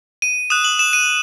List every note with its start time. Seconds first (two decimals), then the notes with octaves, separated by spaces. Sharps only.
0.22 D#7
0.50 D#6 F#6 E7
0.64 F#7
0.79 E7
0.93 D#7